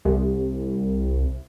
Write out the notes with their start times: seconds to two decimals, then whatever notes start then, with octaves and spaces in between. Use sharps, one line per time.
0.05 C2